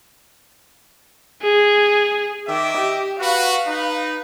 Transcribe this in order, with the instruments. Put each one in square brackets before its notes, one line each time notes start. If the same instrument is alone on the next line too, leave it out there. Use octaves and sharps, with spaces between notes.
[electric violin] G#4
[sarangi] D#3 [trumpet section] D#5 E5 D6
[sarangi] G4
[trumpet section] F#4 B4 [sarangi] F5
[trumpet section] D#4 B4